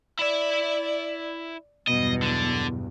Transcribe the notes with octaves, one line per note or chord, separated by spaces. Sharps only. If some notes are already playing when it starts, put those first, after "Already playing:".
E4 D5 E5
B1 E2 G2 B2 D#5
D3